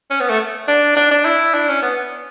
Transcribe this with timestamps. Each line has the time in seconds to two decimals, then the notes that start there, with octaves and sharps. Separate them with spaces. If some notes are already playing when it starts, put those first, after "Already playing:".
0.10 C#4
0.20 B3
0.30 A3
0.68 D4
0.96 D4
1.11 D4
1.25 E4
1.54 D4
1.69 C#4
1.82 B3